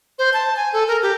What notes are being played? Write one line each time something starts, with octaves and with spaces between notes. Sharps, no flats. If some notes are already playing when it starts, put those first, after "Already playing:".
C5
A5
G#5
A4
A#4
G4